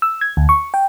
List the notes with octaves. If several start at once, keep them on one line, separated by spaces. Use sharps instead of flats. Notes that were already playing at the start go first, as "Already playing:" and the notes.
E6
G#6
D2
C#6
G5